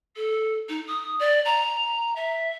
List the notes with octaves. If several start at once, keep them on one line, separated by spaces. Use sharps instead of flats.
A4
D#4
D#6
D5
A#5
E5